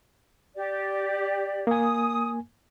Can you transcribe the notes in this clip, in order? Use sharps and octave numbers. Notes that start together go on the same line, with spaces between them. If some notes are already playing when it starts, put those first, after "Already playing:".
G4 D5
A#3 G#5 D#6